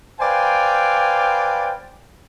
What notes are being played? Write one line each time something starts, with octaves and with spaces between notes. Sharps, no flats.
B4 C5 D5 F5 G5 G#5